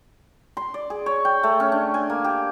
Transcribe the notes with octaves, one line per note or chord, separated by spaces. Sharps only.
C6
D5
G#4
C#5
G5
A3
C#4
D4
G#5
A#3
G4